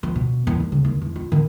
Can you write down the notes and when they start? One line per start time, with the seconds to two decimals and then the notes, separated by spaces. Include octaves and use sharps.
0.03 F3
0.16 B2
0.47 E2
0.60 D#2
0.72 C#3
0.85 D#2
1.02 E2
1.16 F4
1.32 D#3